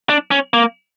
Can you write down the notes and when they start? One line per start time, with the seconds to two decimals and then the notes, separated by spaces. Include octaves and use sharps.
0.09 D4
0.31 C#4
0.54 A#3